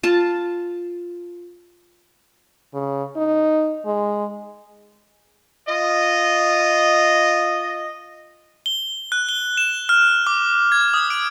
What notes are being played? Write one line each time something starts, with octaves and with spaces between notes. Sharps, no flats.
F4 A5
C#3
D#4
G#3
F4 D#5
G7
F#6
G7
E7
F6
D6
G#6
D#6
D7